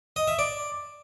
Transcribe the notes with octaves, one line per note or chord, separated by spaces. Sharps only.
D#5
E5
D5